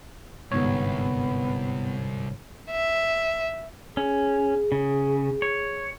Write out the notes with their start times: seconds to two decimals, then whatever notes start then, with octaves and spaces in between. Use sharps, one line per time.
0.52 G1 C2 G#2 B3 C#5
2.71 E5
3.97 C#4 G#4
4.72 C#3
5.42 C#5